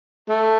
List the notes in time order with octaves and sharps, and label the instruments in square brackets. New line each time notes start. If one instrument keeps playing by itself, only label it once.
[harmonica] A3